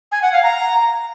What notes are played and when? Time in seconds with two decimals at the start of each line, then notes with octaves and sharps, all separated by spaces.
0.11 G#5
0.22 F#5
0.32 F5
0.43 A#5